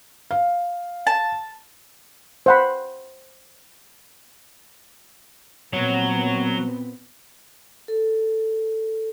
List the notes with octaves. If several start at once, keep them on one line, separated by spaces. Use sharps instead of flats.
F5
A5
C5 F#5 B5
A#2 F#3 B3 C4 C#5
A4